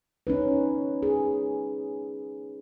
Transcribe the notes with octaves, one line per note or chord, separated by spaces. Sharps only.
C#4 D#4 B4
G#4